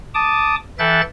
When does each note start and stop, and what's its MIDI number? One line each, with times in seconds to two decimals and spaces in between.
0.14 0.55 81
0.14 0.55 86
0.14 0.55 87
0.79 1.01 52
0.79 1.01 69
0.79 1.01 76
0.79 1.01 79
0.79 1.01 90
0.79 1.01 93